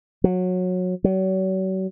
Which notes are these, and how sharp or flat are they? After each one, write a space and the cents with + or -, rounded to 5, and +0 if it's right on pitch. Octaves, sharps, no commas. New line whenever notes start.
F#3 -20
F#3 +40